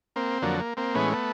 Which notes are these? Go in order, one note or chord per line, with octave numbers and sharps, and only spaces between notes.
A#3 C4
F2 D3 F#3 A#3
A#3
A#3 C4
A2 E3 G#3 B3 C#4
A3 B3